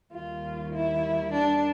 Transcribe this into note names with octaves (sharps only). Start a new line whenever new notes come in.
D#2 D#3 G3 A#3 F4
E4
D4